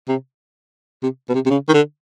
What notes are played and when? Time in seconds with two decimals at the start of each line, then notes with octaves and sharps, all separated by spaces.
0.08 C3
1.03 C3
1.29 B2
1.34 C3
1.46 C3
1.50 C#3
1.69 D#3
1.74 D3